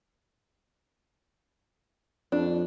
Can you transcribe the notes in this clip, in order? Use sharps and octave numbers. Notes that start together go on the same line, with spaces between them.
F2 D4